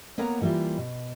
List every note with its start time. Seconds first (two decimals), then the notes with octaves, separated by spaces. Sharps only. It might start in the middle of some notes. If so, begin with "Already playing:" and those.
0.18 A#3 B3 A#4 C#5 F#5 A#5
0.42 E3 G3 A#3 E4 F4
0.78 B2